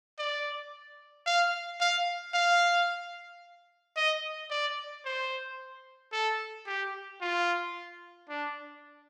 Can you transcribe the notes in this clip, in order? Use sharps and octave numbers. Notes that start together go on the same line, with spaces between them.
D5
F5
F5
F5
D#5
D5
C5
A4
G4
F4
D4